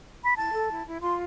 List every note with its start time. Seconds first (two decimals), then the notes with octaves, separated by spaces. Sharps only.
0.25 B5
0.36 E4 A5
0.52 A4
0.70 E4
0.86 E4
1.02 F4 C6